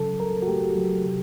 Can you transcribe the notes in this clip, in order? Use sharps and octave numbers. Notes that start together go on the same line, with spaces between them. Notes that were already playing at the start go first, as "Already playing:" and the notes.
Already playing: C#3 F#3 A4
C#2 A#4
F#4
A3 G4
F#3
C3